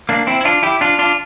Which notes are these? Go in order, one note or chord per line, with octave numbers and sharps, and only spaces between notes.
A#3 D4
C4 E4
E4
D4 F4
E4 G4
D4 F4
D4 F4